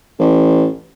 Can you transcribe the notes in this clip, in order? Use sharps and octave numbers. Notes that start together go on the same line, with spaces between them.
A1